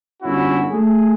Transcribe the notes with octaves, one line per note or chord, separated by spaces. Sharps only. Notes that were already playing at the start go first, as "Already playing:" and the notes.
G1 F#2 C#4 E4 F#4
A3 G#4